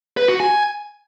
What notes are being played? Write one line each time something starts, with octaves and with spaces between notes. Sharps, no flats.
B4
F#4
G#5